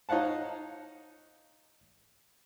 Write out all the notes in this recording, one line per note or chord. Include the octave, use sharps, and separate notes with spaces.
D#4 C#5 F5 F#5 A5